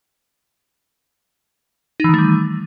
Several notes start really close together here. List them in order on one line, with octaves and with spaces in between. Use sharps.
D#4 E3 D#3 A3 G3